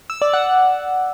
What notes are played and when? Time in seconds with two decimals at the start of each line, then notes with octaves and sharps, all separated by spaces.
0.10 E6
0.22 D5
0.33 F#5